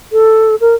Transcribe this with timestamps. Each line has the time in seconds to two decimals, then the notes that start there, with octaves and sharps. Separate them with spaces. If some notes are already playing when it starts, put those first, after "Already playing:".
0.12 A4
0.61 A#4